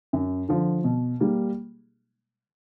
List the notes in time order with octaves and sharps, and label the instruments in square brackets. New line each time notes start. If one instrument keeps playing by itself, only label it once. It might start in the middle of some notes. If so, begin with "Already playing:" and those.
[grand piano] F#2
D3 F3
B2
G3 A#3